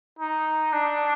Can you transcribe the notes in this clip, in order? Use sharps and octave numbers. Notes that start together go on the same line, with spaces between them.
D#4
D4